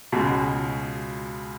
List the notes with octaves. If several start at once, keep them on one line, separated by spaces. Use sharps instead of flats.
C#2 B2 G#3